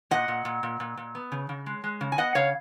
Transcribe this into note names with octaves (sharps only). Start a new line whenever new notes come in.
A#2 D#5 F#5
A#2
A#2
A#2
A#2
A#2
B3
C#3
C#3
G#3
G#3
C#3
G#5
B3 D#5 F#5
C#3 C#5 F5